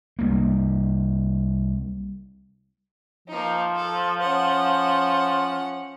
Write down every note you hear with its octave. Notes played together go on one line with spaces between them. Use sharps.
C2 A#3
F3 A#3 D#4
A4
C#4 F#5